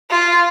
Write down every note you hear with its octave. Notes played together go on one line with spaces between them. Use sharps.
F4